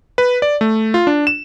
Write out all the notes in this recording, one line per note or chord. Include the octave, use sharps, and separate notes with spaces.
B4
D5
A3
F4
D4
E7